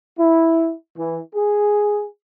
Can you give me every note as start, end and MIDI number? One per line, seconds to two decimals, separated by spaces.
0.17 0.71 64
0.96 1.19 52
1.33 2.04 68